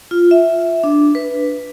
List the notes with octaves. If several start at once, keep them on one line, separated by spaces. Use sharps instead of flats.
F4
E5
D4
B4